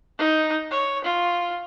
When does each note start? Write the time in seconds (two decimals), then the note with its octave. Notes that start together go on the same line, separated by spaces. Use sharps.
0.18 D#4
0.71 C#5
1.04 F4